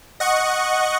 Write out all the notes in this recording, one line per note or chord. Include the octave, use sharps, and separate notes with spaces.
D#5 F#5 C#6